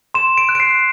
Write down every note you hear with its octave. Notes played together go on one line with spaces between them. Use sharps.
C6 E7
D7
F#6
D7
C7